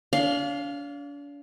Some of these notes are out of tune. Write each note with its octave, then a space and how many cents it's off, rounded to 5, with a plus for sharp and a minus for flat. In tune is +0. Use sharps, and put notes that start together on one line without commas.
D4 -40 F5 +0